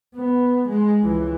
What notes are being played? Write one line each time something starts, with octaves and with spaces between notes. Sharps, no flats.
B3
G#3
C#2 E3